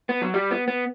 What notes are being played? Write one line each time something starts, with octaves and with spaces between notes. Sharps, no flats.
B3
F#3
G3
B3
B3